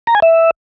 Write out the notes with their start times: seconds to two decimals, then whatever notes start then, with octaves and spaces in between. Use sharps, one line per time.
0.07 A#5
0.15 G#5
0.22 E5